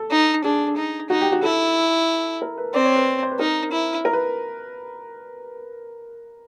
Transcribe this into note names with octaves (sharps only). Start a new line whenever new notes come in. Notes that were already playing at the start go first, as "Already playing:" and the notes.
Already playing: A4
D#4
D4 G#4
D#4
D#4 F#4
G4
F#4
E4 A4
A#4
B4
C4 D5
C#5
B4
C5
B4
D#4 A#4
E4
A#4
B4